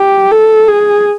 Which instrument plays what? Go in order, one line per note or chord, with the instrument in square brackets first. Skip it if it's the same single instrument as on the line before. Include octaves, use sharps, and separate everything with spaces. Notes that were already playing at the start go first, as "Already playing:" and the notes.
Already playing: [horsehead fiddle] G4
A4
G#4